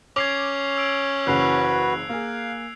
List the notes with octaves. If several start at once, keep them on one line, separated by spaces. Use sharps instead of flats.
C#4 D6 G#6 C7 F7
E6 D7
F#1 C#3 E3 F#4 B4 F#6 C7 F7
A#3 G#4 F5